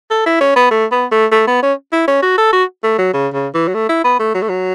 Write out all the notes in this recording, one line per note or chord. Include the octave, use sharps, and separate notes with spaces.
A4
E4
C#4
B3
A3
B3
A3
A3
B3
C#4
E4
C#4
F#4
A4
F#4
A3
F#3
C#3
C#3
E3
F#3
A3
E4
B3
A3
F#3
A3
F#3